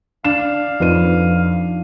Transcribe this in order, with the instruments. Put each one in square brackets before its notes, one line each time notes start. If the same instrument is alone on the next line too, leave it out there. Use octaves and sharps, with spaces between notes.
[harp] D4 [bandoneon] F5 [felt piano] E7
[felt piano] F2 B4 D#7 [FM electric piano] F3 D#4